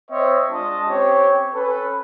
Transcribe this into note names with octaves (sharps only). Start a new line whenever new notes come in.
C4 C5 C#5 D#5 E5
G#3 D4 F4 D#5 A5
C4 C#4 G4 C#5
C#4 A4 B4